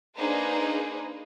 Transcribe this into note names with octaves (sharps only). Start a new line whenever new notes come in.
A#3 D4 D#4 G#4 B4 C5